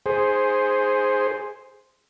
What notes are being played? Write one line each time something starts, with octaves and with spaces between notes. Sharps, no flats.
G#4 C5